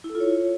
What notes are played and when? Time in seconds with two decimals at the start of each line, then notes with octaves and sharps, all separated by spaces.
0.04 E4
0.10 A4
0.15 F4
0.20 C#5